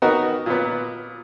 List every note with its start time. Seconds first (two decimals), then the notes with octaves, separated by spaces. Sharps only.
0.02 B3 D#4 F#4 A#4
0.46 A#2 B3